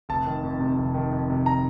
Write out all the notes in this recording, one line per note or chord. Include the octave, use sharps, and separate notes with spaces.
F1 A5
D#3
F2
C3
F1
D#3
F2
C3
A#5